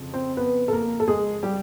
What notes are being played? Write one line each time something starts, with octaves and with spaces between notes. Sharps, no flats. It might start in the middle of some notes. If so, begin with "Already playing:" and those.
Already playing: F2 C#3 F3
C4 C5
B3 B4
A4
A#3 A#4
A4
G#3 G#4
G3 G4